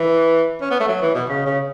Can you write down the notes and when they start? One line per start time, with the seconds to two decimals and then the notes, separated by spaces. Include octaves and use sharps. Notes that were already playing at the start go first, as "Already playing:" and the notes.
Already playing: E3
0.61 C#4
0.71 B3
0.80 A3
0.88 F#3
1.02 E3
1.15 B2
1.29 C#3
1.46 C#3